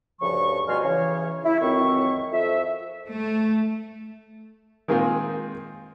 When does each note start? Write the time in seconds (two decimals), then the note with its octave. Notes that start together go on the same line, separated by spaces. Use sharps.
0.21 D2 G2 C#3 F3 C#6
0.68 C#2 B2 G3 G#5 C6 F6
0.84 C#3 E3 C#5
1.45 E4
1.62 C#2 F#2 D#3 C4 E5 C#6
2.32 F2 E5
3.11 A3
4.88 D#3 G#3 A#3 C4 F4 G#4